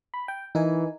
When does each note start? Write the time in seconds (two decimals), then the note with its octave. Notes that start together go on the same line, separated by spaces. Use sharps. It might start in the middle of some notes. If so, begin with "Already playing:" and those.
0.14 B5
0.28 G5
0.55 E3 D#4 A#4 G#5